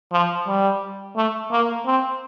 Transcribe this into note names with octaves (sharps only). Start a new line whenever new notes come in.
F3
G3
A3
A#3
C4